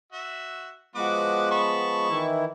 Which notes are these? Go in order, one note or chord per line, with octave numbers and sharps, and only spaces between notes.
F#4 E5
F3 G#3 B3 F#4 B4 D6
A5 B5 C#6
D#3 E3 E4